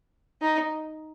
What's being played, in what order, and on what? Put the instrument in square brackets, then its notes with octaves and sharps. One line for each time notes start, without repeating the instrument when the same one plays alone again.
[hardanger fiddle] D#4